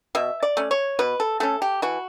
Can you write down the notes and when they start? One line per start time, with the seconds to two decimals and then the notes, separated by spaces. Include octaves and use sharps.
0.15 B2 E5
0.43 D5
0.57 A3 C#4
0.71 C#5
0.99 B2 B4
1.20 A4
1.40 A3 C#4 A4
1.62 G4
1.82 E3 F#4